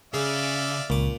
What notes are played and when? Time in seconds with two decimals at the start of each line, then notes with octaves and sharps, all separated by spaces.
0.14 C#3 G#4 D5 E5 F5
0.90 C#2 A#2 D6